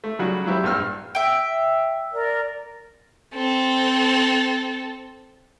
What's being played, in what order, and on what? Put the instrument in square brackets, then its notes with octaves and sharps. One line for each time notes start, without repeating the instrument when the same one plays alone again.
[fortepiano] A3
C#3 F#3 G3 F#4
F#3 E4 G4 C5
A#1 G2 E6 F6
[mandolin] E5 G5
[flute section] A#4 D5
[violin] C4 A4